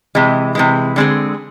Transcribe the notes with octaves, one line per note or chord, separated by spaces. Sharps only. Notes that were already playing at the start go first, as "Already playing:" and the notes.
C3 E3 G#3
C3 E3 G#3
D3 G#3 C4 G#4